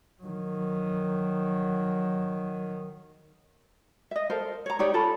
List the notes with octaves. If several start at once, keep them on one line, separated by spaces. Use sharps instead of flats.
D#3 F#3
D#5 E5
A4 A#4 C5 F5
C#5 A#5
D#4 G4 C#5 D5
F4 A4 A5 B5